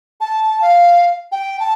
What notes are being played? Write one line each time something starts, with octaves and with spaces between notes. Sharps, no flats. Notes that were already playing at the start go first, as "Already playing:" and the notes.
A5
F5
G5
A5